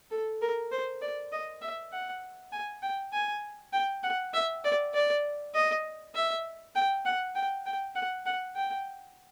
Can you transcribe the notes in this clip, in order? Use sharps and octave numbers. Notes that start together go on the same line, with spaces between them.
A4
A#4
C5
D5
D#5
E5
F#5
G#5
G5
G#5
G5
F#5
E5
D5
D5
D#5
E5
G5
F#5
G5
G5
F#5
F#5
G5